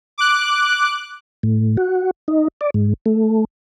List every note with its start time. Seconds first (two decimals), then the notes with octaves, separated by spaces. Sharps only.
0.18 D6 F#6
1.43 A2
1.77 F#4
2.28 D#4
2.61 D5
2.74 G#2
3.06 A3